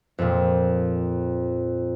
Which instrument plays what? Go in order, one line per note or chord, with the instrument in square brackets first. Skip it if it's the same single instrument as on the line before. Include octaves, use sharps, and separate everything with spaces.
[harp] F2 A#2